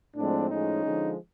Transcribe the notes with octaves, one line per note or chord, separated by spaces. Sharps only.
A2 F3 G#3 C4 D4
A2 F3 G#3 C#4 D#4
D3 F3 G#3